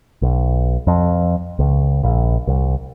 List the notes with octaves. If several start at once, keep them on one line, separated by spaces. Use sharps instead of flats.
B1
F2
C#2
A#1
C2